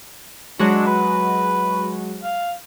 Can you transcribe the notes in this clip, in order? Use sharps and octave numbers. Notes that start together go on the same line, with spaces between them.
F#3 G#3 D4 F#4
B4
F5